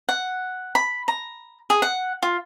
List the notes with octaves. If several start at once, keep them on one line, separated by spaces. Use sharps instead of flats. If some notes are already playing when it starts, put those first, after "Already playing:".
F#5
B5
A#5
G#4
F#5
F4